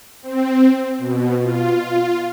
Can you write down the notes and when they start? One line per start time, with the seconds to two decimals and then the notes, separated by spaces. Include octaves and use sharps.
0.22 C4
0.98 B2
1.42 F4